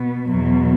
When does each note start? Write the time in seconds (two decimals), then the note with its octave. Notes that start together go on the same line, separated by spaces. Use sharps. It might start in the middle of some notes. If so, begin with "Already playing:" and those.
Already playing: B2 B3
0.29 E2 B2 F#3